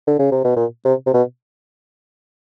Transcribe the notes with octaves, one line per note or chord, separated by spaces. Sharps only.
D3
C#3
C3
B2
A#2
C3
C3
B2